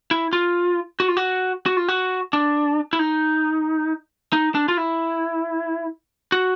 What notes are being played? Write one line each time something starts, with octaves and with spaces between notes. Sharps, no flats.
E4
F4
F#4
F4
F#4
F#4
F4
F#4
D4
E4
D#4
D#4
D4
F4
E4
F#4